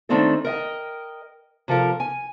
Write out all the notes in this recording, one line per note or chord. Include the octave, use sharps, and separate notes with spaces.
D#3 A3 C4 D4 D#4 A4
A#4 D#5 G5
C3 F3 A4 A#4
G#5